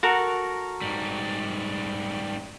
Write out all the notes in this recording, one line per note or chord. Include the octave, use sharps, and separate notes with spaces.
F#4 A4 A#4
G#2 G3